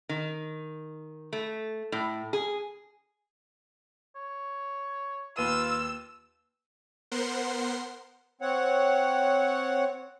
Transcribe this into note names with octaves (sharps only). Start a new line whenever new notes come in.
D#3
A3
A2
G#4
C#5
D#2 F4 B4 E6 D#7
B3 A#4 C5 F#5 C6
C4 C#5 F#5